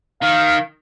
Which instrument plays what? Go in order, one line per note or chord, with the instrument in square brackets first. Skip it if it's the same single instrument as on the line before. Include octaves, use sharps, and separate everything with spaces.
[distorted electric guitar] D#3 [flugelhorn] F5